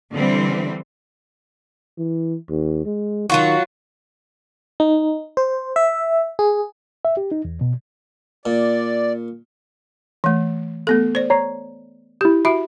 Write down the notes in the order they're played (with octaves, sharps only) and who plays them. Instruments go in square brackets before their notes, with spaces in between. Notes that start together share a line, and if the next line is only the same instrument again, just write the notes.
[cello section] D3 E3 G3 C4
[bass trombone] E3
D#2
G#3
[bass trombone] D#3 [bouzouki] F#3 F4 F#4
[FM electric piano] D#4
C5
E5
G#4
[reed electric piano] E5
G4
D#4
E2
B2
[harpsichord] A#2 [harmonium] D5
[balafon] E3 A3
A3 B3 A4
C5 D5
[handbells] C#5 A#5 C7
[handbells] E4 G6 [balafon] G4
[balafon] F#4 E5 [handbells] B5